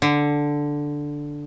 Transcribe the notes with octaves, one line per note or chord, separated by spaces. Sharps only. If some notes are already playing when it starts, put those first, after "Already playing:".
D3